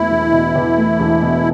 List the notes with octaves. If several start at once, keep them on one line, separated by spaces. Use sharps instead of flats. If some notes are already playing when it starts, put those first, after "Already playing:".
Already playing: E1 E2 B2 A3 E4
E1
B2
E2
A3
E1
B2